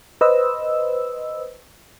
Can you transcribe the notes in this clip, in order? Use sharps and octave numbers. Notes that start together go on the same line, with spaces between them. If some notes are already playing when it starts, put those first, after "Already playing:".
B4 C5 D#5 E6